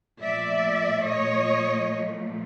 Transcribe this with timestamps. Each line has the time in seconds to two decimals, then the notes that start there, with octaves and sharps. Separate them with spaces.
0.21 A#2 F3 A3 D5 E5
1.05 C#5 D#5